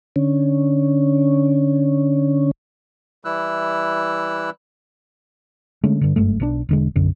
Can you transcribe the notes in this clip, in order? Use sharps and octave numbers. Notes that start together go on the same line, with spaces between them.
D3 C#4
E3 G3 E4 E6 F#6
D3 G#3 A3 C#4
G2 D3
F#1 G2 G#3 A3
B1 C#3 D4
E1 D3 G#3
B1 F#2 D3